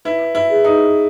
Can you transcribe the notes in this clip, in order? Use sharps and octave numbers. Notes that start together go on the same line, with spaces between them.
E4 B4
E4
G#4
D#4